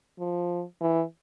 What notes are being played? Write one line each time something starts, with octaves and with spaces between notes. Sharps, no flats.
F3
E3